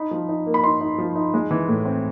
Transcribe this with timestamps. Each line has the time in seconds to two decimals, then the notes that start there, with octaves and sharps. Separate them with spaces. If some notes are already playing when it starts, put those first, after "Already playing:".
Already playing: D#4 B5
0.11 F3
0.29 D#4
0.46 A#3
0.54 B5
0.63 D#4 C6
0.81 D#4
0.98 F3
1.15 D#4
1.34 G#3
1.51 E3
1.68 A2
1.85 C4